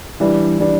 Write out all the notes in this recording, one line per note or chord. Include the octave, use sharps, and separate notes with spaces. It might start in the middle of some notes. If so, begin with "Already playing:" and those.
E3 G3 D4
E3 G3 D4